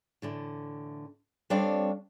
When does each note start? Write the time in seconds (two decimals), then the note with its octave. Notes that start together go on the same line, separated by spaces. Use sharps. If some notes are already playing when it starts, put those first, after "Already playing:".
0.22 A2 D3 E3
1.50 G3 C4 D4 A4 C#5 F5